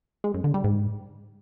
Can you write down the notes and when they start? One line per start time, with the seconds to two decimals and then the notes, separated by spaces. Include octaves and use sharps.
0.24 G#3
0.34 F#2
0.44 D3
0.54 G3
0.64 G#2